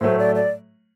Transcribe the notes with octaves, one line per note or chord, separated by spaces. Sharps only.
A2 F#3 A3 C5
D5
D5